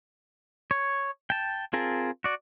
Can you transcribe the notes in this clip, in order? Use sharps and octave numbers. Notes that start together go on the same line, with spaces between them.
C#5
G5 A5
C4 F4 G#4 A#4 A5
F#4 D5